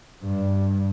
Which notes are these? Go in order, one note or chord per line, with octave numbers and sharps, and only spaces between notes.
G2